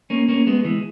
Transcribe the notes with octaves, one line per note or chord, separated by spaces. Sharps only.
A#3 C#4
A#3 C#4
G#3 B3
E3 G#3